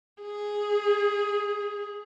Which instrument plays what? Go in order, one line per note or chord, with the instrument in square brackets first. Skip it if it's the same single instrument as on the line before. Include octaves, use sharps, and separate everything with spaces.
[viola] G#4